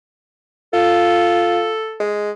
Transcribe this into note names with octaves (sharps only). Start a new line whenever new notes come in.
F4 A4
G#3